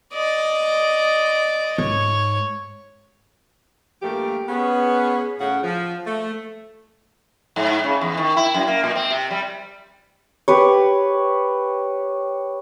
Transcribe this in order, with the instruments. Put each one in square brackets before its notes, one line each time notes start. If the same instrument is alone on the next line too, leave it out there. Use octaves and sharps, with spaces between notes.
[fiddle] D5 D#5
[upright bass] G#2 [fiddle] C#5
[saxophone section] G2 A#2 F3 A3 G4 A#4
B3 C#4 G#4
A2 C#3 F#5
F3
A3
[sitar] G#2
C#3
E2
D#3
E4
F#2
A#3
A#2
C4
C3
G3
[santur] G4 B4 C#5